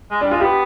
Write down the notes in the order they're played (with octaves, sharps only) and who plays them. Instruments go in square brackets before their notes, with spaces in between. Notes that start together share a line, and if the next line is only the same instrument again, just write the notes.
[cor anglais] G#3
[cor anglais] G3 [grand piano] D4
[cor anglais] G#3 [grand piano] F4
[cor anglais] B3 [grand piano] G4